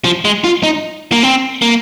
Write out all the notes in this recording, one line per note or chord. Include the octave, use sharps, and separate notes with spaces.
F3
G#3
F4
D#4
A#3
C4
A#3